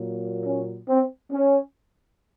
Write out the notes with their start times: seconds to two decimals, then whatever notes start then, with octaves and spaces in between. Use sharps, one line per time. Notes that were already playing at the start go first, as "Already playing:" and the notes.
Already playing: A#2 F#3 A#3
0.46 C#4
0.89 C4
1.31 C#4